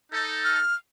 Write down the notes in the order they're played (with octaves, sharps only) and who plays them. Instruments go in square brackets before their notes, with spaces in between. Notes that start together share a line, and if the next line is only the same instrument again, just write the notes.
[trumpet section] D#4 A4
[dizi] F6